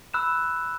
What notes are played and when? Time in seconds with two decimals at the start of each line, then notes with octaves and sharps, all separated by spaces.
0.14 B5 E6 F#6 E7